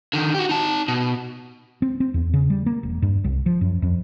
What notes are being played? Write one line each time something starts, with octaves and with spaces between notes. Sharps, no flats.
D3 D#3
F#4 G4
D#4 A5
B2
C4
C4
E2
C#3
G3
A#3
E1
G2
C2
F3
F#2
F2